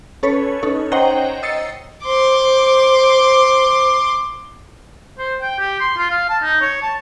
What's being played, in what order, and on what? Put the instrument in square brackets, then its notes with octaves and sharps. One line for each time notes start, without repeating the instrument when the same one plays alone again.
[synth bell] C#4 A4 B4 C#5
C#4 D#4 A4 C#5
C5 C#5 D#5 F#5 G5 A#5
D#5 E6 A6 C7 C#7
[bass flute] C5 [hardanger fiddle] C6 D6
[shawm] C5
G5
G4
C6
F4
F5
A5
D#4
C#5
A5